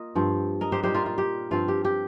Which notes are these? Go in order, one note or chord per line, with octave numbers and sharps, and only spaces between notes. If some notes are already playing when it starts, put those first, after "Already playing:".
Already playing: A#3 F4 D#5
G2 F3 C4
A#4 D#5
G4 C5
A#2 G3 D#4 G4 C5
F4 A#4
F4
G4
G2 F3 C4 F4
G4
G4